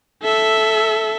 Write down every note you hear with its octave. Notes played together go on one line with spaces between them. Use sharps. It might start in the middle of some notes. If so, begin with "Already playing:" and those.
A4 E5